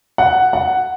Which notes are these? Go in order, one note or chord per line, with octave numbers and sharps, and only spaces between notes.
F#5
F#5